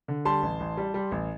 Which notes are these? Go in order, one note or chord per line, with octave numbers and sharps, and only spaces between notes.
D3
G3 A5 C6
A1
A1
G3
G3
A1